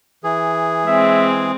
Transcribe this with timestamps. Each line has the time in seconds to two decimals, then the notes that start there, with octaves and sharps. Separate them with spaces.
0.24 E3 G#4
0.86 G#3 C4 E5